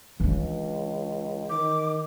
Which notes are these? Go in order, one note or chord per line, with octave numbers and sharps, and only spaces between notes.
C#2 E3 D4
D#3 D6